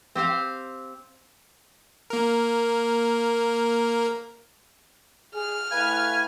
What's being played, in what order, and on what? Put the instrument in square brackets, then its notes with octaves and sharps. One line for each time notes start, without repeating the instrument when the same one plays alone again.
[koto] C4 G4 C5 F5
[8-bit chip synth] A#3 A#4
[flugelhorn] G#4 [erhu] F6
[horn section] A2 B4 [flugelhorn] F5 [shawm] G#5